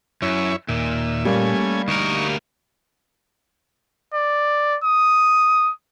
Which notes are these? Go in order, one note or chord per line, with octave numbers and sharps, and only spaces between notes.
F#2 E4 C#5
D#2 A#2 E5
G3 A3 A#3 C#4 G#5
D2 D#4 A#4 C#6
D5
D#6